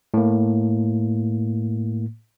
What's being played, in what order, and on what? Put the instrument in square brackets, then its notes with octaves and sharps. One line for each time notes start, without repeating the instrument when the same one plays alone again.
[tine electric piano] A2 A#3